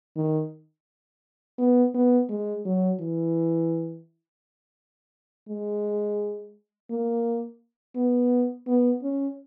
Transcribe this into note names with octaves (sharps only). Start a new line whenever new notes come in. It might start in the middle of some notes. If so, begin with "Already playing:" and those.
D#3
B3
B3
G#3
F#3
E3
G#3
A#3
B3
B3
C#4